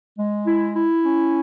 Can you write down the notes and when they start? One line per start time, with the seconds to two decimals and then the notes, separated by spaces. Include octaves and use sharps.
0.18 G#3
0.47 E4
0.75 E4
1.05 C#4